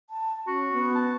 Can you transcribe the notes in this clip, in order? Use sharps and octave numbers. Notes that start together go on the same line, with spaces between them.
A5
C#4 F#4
B3
A5